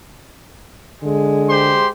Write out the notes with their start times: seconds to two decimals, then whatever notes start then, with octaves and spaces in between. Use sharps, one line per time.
1.03 D3 G#3
1.49 G4 C5 C6